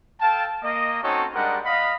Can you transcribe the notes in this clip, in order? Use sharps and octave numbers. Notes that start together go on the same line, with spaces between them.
A4 F5 G5 A5
A#3 D#5
C4 C#4 D#4 F#4 A4 C#5
G3 G#3 D4 A#4 D#5 F#5
D#5 F5 B5